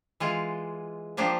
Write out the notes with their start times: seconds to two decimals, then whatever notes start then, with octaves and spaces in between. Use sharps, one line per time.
0.20 E3 G#3 F4
1.17 F3 A#3 D4 G4 C5